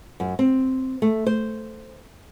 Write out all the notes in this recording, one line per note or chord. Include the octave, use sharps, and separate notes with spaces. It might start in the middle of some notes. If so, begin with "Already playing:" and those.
F#2
C4
A3
C5